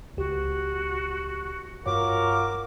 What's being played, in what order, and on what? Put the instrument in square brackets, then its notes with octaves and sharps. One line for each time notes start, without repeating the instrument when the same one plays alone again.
[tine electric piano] C#2 G4 [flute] F#4
[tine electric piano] G2 C#5 [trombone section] F4 F#4 A#4 [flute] D6